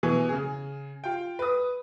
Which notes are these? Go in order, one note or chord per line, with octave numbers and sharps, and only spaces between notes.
B2 E3 G#5
C#3 G#4
F4 G5
B4 D#6